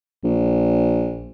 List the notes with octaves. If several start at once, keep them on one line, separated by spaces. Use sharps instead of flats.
A#1